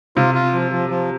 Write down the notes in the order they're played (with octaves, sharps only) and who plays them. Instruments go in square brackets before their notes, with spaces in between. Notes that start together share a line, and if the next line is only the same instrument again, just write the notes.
[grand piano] C3 [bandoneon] F4
[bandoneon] F4
F3
F3
F3